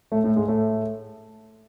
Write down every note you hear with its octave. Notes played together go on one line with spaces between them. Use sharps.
A2 A3
A2 A3
G#2 G#3
A2 A3